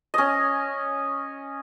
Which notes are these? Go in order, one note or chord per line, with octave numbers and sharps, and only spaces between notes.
C#4 D#5